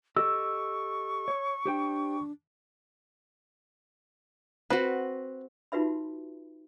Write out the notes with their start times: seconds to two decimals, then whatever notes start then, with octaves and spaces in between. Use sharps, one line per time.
0.17 G4 A4 D#5 C#6 E6
1.28 C#5
1.66 D4 G4 C5 G5
4.70 C4 F#4 B4
5.72 D#4 F4 F#4 B4 E5 B5